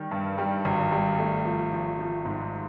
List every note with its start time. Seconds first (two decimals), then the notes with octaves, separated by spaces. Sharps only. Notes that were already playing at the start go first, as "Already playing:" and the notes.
Already playing: D#3 G3
0.11 G2
0.38 G3
0.65 G#1
0.92 G3
1.18 A3
1.45 F3
1.72 F3
1.99 F3
2.25 G#2